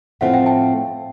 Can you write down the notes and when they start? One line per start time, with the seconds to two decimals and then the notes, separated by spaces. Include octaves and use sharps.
0.21 A2 F3 A3 C4 E5 F#5
0.34 F5 G5
0.46 G5 A5